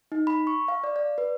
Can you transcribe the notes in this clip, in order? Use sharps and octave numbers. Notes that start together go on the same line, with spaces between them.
D#4
B5
C#6
F5
D5
D5
B4